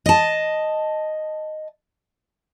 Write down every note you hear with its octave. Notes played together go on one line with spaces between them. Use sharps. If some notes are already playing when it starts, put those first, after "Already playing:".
D#5 A5